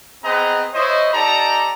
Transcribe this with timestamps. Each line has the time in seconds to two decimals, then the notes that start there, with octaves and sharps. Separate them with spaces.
0.24 B3 C4 G#4 B4 D#5 A#5
0.74 E4 C5 C#5 D#5
1.14 D#4 G4 A4 D5 A5 A#5